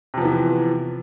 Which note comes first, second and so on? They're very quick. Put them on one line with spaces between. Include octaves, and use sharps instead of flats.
C3 F3 B3 E3